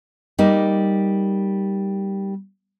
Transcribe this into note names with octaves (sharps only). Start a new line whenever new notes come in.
G3 A#3 D#4